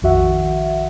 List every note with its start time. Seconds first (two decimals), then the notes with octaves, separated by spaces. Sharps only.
0.02 A#1 F2 D#3 F#4 E5 F#5